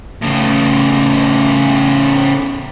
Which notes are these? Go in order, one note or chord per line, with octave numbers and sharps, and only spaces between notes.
A2 C#3